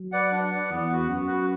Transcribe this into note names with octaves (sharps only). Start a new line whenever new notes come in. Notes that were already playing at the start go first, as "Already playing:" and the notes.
Already playing: F#3
B4 D5 F#5
D4
B4 D5 F#5
E2 B3
F#4 B4
F#2 B3
F#4 B4